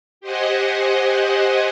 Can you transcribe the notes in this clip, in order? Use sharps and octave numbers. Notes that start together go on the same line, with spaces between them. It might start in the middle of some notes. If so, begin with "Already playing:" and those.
G4 C5 D#5 F#5 G#5